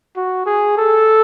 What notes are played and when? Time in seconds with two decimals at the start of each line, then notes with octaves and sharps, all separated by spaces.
0.16 F#4
0.46 G#4
0.78 A4